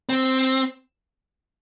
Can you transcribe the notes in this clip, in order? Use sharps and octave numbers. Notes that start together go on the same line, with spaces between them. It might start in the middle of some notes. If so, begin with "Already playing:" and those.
C4